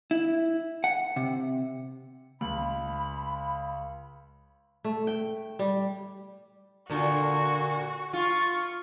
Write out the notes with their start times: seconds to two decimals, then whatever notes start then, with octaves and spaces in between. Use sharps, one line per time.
0.11 E4
0.84 F#5
1.16 C3
2.41 C#2 B5 F#7
4.85 A3
5.07 G5
5.59 G3
6.90 A#2 D3 F#4
8.13 F4 C#6